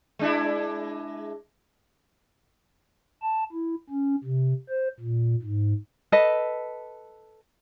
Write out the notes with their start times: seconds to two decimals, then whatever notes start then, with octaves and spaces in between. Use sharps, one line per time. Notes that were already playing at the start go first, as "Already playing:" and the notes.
0.19 G#3 D4 E4
3.22 A5
3.52 E4
3.90 C#4
4.24 C3
4.69 C5
5.00 A#2
5.42 G#2
6.12 A4 B4 D#5